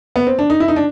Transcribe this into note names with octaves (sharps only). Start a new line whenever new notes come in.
B3
C4
D4
D#4
E4
D#4
D4